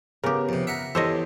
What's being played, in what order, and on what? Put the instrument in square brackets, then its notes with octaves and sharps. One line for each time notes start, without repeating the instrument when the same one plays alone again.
[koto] C#3 G4 [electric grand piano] B3 A#4
[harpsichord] F2 C3
E5 F#5 A#5
[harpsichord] E2 [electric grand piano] G4 A4 E6 [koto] C5 C#5 D#5